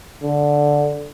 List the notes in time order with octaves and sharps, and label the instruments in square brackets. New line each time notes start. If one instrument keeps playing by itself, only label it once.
[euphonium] D3